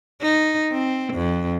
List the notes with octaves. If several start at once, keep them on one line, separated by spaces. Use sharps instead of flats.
D#4
C4
F2